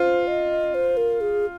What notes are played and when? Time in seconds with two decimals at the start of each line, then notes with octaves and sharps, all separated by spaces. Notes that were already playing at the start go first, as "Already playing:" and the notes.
Already playing: F4 C5
0.27 D#5
0.75 C5
0.97 A#4
1.21 G#4